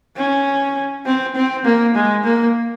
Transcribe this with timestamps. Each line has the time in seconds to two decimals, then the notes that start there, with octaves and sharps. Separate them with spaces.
0.17 C#4
1.05 C4
1.36 C4
1.65 A#3
1.95 G#3
2.24 A#3